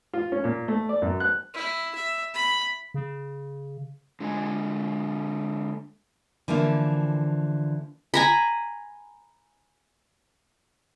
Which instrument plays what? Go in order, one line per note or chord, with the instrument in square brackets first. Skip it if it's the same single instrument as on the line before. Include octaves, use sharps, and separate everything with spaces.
[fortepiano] F4
C#4
A#2
A3
D5
F#2
F#6
[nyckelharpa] E4
E5
B5
[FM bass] C#3
[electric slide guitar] D3 G#3 F4 D#5 G#5
[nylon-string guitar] D3 E3 F3 A#3 E4
[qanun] G#5 A#5 B5